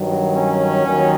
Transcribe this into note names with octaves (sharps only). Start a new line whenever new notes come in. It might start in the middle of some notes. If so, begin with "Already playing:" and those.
Already playing: G2 D#3 F#3
C#4
D#2 D#3 F#3